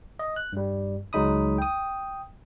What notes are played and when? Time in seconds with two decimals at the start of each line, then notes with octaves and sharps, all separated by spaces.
0.19 D#5
0.36 F#6
0.52 G2 G3
1.13 C#2 F#3 G#3 D#4 B5 D#6
1.58 G5 D#6